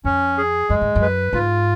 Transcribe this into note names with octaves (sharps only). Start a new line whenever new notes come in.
F2 C#4
G#4
F#2 G#3
G#2
F#2
B4
G#2 F4